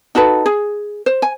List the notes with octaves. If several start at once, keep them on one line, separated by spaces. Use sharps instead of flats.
D#4 F#4 A4 B4
G#4
C5
G#5